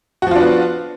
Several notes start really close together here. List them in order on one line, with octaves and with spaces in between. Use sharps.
F#4 F3 F4 D4 B3